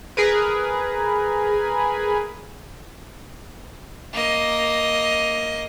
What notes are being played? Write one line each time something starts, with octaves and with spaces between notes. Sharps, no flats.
G#4 A#4 B4
A#3 D#5